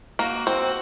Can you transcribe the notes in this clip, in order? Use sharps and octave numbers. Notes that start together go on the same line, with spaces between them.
A#3 F#4
C4